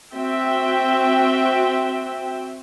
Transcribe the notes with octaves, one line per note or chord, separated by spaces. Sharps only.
C4 F#4 E5 G5